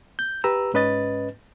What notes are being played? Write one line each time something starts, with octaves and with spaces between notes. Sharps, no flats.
G6
G4 B4 A#5 E6
G#2 C#4 B4 D#5 A6